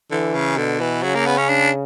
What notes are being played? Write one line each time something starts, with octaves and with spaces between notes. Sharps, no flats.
D3 E3
C#3
B2 D3
E3
C#3 F#3
A#3
B3
C#4
D4